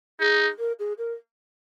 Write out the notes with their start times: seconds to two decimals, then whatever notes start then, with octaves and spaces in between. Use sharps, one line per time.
0.20 D#4 G#4
0.59 A#4
0.79 G#4
0.98 A#4